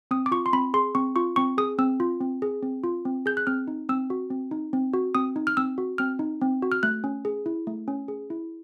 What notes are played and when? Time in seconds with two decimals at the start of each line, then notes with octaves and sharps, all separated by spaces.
0.11 C4 D#6
0.26 D6
0.31 F4 C#6
0.46 C6
0.53 C4 B5
0.74 G#4 C6
0.95 C4 C#6
1.16 F4 C#6
1.36 C4 C#6
1.58 G#4 D#6
1.78 C4 E6
2.00 F4
2.21 C4
2.42 G#4
2.63 C4
2.84 F4
3.05 C4
3.26 G#4 G6
3.37 F#6
3.47 C4 F6
3.67 D#4
3.89 C4 E6
4.10 F#4
4.30 C4
4.51 D#4
4.73 C4
4.93 F#4
5.15 C4 D#6
5.36 D#4
5.47 F6
5.57 C4 E6
5.78 F#4
5.98 C4 F6
6.19 D#4
6.41 C4
6.62 F#4
6.72 F6
6.83 A3 F#6
7.04 C#4
7.25 G#4
7.46 E4
7.67 A3
7.88 C#4
8.08 G#4
8.30 E4